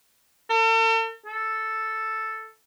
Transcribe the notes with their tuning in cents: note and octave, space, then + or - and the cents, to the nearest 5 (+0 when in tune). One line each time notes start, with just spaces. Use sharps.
A4 +45
A4 +0